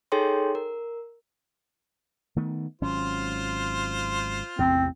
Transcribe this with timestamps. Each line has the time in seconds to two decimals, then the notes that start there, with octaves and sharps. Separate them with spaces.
0.12 D#4 G#4 A4 C#5 G5 C6
0.55 A#4
2.36 D#3 A3 B3
2.81 G#1 F#3 C#4 F4 C5
4.59 A1 E2 C3 C4